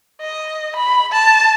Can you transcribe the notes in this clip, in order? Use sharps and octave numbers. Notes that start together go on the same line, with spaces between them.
D#5
B5
A5